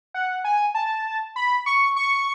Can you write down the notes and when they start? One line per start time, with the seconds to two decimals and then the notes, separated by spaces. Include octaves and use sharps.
0.14 F#5
0.44 G#5
0.75 A5
1.36 B5
1.66 C#6
1.96 C#6